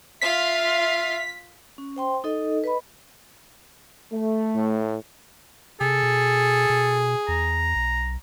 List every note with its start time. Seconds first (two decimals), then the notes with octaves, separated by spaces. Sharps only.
0.22 F4 E5 F5 C6 B6
1.78 C#4
1.96 C5 G5 C6
2.24 D#4 A4 D#5
2.64 B4 D#5 B5
4.12 A3
4.56 A2
5.81 C3 G#4 A4
6.03 B2
6.70 B2
7.28 E2 A#5
7.76 B1